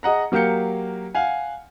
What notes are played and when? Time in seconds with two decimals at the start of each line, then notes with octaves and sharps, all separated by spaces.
0.03 G#4 D#5 F#5 A#5
0.32 F#3 A#3 G4 F5 G6 C#7
1.15 F5 F#5 G#5